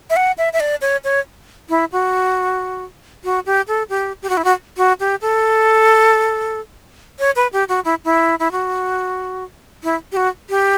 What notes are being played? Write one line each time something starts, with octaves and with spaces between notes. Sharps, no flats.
E5
F#5
E5
E5
D5
C#5
C#5
E4
F#4
F#4
G4
A4
G4
G4
F#4
E4
F#4
F#4
G4
A4
C#5
B4
G4
F#4
E4
E4
E4
F#4
E4
G4
F#4
G4